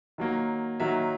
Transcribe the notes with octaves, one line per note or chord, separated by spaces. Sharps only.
D#3 F#3 A#3
D#3 F#3 A#3 E5